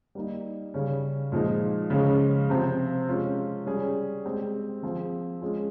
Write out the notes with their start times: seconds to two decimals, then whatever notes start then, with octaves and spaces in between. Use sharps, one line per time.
0.15 G3 A#3 D#4
0.74 C#3 G3 C#4 G#4
1.32 A#2 F3 G#3 D#4
1.90 C#3 F3 G#3 C#4
2.49 C3 F3 C4
3.08 G#3 C#4 F4
3.66 G3 C#4 G#4
4.25 G#3 C4 G4
4.83 F3 C4 F4 G#4
5.42 G#3 C#4 F4 G#4